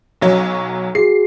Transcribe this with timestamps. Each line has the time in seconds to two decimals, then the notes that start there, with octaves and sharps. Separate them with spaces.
0.21 B1 F#3 C#5
0.95 F#4 G#4 C7